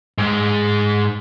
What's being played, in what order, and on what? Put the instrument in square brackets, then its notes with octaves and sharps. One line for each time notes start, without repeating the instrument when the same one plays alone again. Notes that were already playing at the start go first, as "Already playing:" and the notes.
[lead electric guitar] G#2 G#3